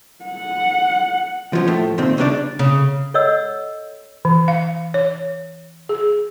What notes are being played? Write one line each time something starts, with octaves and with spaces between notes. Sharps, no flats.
F#5
F3 F#3 C#4
A2 F3 A3
A#2 D#3 C4
D2 C#3 G3 C4 D4 D5
C#3
A4 C#5 D#5 F#5 E6
E3
F5
C#5
G#4